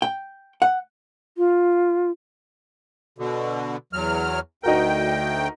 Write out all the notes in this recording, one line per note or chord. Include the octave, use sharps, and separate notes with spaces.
G5
F#5
F4
B2 D3
E2 F#3 F6
D2 D#4 F#4 A#4 G5